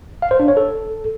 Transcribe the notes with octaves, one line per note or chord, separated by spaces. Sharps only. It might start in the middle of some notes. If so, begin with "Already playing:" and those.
F5
C5
D4
C#5
A4